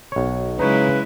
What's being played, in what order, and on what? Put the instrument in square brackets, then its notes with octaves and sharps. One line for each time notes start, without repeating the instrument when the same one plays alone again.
[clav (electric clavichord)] B1 C#5
[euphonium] C#3 [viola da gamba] F#3 G#3 E4 [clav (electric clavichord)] D#4 C#5 [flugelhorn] B4